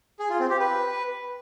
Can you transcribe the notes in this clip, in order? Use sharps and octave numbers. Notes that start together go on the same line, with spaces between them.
G#4
F4
C4
G4
B4